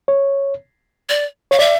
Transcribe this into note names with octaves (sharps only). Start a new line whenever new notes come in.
C#5
D5
C#5 F5
D5 E5